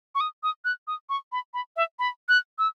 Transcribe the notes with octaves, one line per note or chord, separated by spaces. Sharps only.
C#6
D#6
D#6
F#6
D#6
C#6
B5
B5
E5
B5
F#6
E6